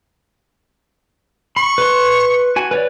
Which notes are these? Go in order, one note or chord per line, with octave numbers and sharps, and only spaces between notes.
B5 C#6
B4 C6
F#4 G#5
B4 C#5 D5